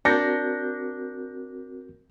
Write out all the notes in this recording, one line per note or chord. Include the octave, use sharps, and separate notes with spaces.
C4 D4 F#4 A#4 G6 A#6 C#7